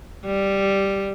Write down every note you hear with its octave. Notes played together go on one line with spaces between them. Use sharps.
G3